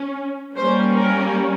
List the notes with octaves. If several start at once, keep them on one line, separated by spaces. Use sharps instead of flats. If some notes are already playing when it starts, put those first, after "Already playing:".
Already playing: C#4
G3 A#3 C#4 C5
A#4